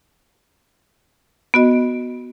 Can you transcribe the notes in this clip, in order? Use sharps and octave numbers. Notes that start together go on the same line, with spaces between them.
B3 F#4 D#5